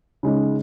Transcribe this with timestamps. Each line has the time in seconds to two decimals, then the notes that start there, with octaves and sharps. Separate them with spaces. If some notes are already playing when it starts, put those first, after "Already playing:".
0.23 C#3 G#3 D#4